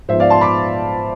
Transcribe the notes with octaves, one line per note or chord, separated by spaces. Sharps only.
G#2 F3 B3 C5 E5
D5 F5
A5 C6
B5 D6